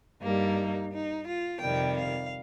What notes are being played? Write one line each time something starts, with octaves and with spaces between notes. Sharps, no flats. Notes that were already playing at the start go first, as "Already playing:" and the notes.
G2 G3 A#3 D#4
D#4
F4
F2 C3 D#3 G3 G5
F5